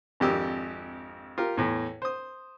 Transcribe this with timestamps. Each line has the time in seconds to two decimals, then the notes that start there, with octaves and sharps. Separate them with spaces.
0.20 G#1 F2 D4 G4 D#6 E6
1.38 F4 G4 A#4
1.57 E2 A2
2.02 C5 D#6